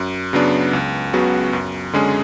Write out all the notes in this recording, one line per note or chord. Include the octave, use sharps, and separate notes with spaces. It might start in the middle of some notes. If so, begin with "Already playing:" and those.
Already playing: F#2
C#3 F#3 B3 D4
C#2
C#3 F#3 B3 F#4
F#2
D3 G#3 C#4 G#4